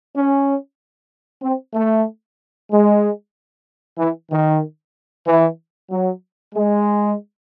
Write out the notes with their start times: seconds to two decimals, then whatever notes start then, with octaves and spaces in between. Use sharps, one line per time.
0.15 C#4
1.42 C4
1.74 A3
2.71 G#3
3.98 E3
4.31 D#3
5.26 E3
5.90 F#3
6.54 G#3